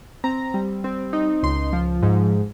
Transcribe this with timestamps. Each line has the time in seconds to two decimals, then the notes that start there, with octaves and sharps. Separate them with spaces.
0.24 C4 A#5
0.54 G3
0.84 C4
1.13 D#4
1.43 C#2 C6
1.73 F3
2.02 G#2